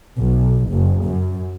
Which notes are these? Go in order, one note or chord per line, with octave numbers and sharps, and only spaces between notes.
B1
F#1
F#2